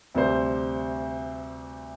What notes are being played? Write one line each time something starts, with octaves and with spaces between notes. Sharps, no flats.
D2 C3 G3 D4 C5